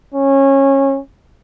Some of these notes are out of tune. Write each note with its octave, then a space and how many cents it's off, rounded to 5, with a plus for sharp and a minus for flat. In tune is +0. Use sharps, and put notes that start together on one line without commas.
C#4 -20